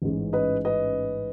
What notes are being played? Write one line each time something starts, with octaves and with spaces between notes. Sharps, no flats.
A1 G#2 E3 G#3 C#4
B4 D#5
B4 D#5